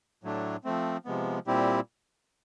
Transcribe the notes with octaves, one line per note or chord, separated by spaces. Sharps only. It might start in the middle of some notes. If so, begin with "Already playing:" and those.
A2 F#3 A3 D4
F3 A3 C4
C3 F3 G#3 B3
A#2 G3 C4 E4 G4